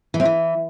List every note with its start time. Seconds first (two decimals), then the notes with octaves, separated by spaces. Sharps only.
0.14 E3
0.20 C4
0.25 E3